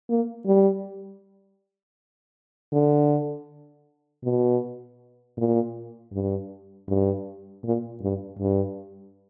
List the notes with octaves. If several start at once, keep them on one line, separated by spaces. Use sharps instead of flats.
A#3
G3
D3
B2
A#2
G2
G2
A#2
G2
G2